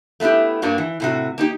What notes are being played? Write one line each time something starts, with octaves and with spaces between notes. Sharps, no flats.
A3 B3 D#4 E4 G4
G2 G3 A#3 D4 F#4
E3
A2 C3 F#4
A#3 D#4 G4